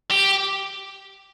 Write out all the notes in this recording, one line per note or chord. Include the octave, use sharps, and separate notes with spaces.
G4